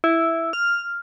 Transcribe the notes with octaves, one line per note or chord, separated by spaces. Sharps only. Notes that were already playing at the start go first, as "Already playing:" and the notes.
E4
F6